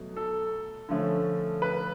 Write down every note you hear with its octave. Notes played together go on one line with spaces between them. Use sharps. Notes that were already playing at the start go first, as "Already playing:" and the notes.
Already playing: B2 F#3 A3
A4
D3 F3 A3 C#4
B4